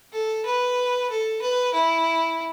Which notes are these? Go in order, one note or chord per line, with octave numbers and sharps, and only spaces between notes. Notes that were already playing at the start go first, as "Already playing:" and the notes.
A4
B4
A4
B4
E4